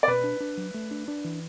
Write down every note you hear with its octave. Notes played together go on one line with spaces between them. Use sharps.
D5
B2 B4
D4
D4
F#3
A3
D4
D4
E3